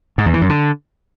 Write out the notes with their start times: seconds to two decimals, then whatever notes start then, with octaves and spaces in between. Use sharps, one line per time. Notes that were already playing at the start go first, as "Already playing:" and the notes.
0.18 G#2
0.26 E2
0.34 E3
0.41 F#2
0.49 D3